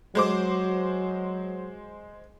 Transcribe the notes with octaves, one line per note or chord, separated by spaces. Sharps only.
F#3 G#3 C5 D6